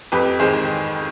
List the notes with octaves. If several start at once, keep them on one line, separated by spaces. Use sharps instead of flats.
F2 G4 B4
D#3 G#3 G#4 C5